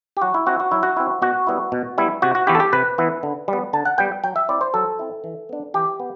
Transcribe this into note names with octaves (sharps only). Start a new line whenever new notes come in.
G4
F#3 F#4
E4
C4 E4 F#4
F#4
F#3 E4
F#4
C4 E4
B2 F#4
G3 B3 E4
B2
G3 B3 E4
C3 F#4
F#4
E3 B3 E4 G4
A4
G4
C3 B4
E3 B3 E4
D3
G3
B3
D3 A5
F#5
G3 B3 G5
F#3 G5
E5
C4 E4 D5
C5
F#3 A4
C4 E4
E3
B3 D4
E3 G4
B3